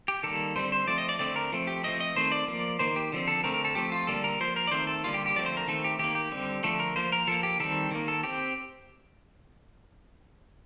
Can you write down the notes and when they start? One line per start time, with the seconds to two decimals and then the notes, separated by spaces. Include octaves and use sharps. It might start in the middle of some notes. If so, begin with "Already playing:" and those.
0.08 G4
0.23 D#3 G3 A#3 A4
0.56 D3 G3 C4 C5
0.72 C5
0.87 F3 A3 C4 D5
0.98 D#5
1.09 D5
1.19 D3 A3 C4 D5
1.36 A#4
1.52 F3 A3 C4
1.67 G4
1.83 F3 A3 C4 D#5
2.00 D#5
2.15 D#3 A3 C4 C5
2.32 D5
2.48 F3 A#3
2.79 D#3 A#3 C5
2.96 G4
3.12 D3 F3 C4
3.28 A4
3.44 D3 A3 C4 A#4
3.54 A#4
3.65 A4
3.75 F3 A3 C4 G4
3.92 F4
4.07 D3 G3 A#3 A4
4.24 A#4
4.40 F3 A#3 C5
4.56 A#4
4.67 D5
4.71 D#3 A3 C4 C5
4.87 A4
5.04 D3 G3 A#3 F4
5.14 G4
5.26 G4
5.36 D3 F3 A3 C4 D5
5.46 C5
5.57 A#4
5.67 D#3 A3 C4 A4
5.84 G4
5.99 D#3 A#3 G4
6.15 G4
6.31 D3 G3 C4
6.63 D3 F3 A3 A4
6.80 A#4
6.96 F3 A#3 C5
7.12 A#4
7.28 F3 A#3 A4
7.43 G4
7.60 D#3 G3 C4 A4
7.91 D#3 A#3
8.08 A4
8.23 C4 G4